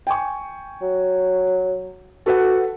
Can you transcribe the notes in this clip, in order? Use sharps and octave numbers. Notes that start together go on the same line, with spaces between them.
G5 G#5 C#6
F#3
F#4 A4 B4 F#5